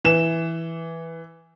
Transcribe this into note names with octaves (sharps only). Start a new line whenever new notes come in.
E3 E7